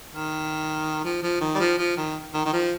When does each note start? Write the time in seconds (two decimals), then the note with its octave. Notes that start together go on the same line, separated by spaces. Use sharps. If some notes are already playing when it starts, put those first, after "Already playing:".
0.11 D#3
1.04 F3
1.23 F3
1.41 D#3
1.55 G3
1.60 F3
1.78 F3
1.97 D#3
2.34 D#3
2.46 D#3
2.53 F3